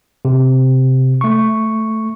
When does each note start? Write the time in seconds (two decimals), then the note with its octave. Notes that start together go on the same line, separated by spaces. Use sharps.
0.25 C3
1.21 A3 C#6